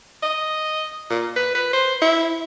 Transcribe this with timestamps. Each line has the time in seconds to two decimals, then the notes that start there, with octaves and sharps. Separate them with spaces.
0.23 D#5
1.10 A#2
1.36 B4
1.55 B4
1.73 C5
2.02 E4